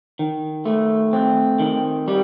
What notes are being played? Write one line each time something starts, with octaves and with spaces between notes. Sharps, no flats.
D#3
A3
C4
D#3
G3